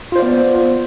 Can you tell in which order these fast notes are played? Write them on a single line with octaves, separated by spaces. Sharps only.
F4 C5 D5 B3